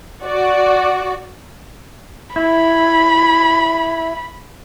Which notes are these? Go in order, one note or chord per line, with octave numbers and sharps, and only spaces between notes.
F#4 D5
E4 B5